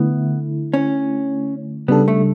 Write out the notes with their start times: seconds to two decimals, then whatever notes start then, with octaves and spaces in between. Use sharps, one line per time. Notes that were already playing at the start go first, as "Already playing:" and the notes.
Already playing: D3 A3 B3 E4
0.74 C#4
1.88 C#3 G3 B3 D4 A4
2.08 A3